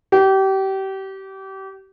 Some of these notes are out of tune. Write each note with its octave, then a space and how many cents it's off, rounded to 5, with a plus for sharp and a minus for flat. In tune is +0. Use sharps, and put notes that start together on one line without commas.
G4 -30